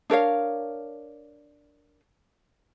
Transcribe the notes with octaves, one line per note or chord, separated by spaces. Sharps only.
D4 A#4 C#5 F5